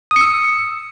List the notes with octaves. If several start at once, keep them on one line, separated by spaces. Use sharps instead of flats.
D#6 E6 C#7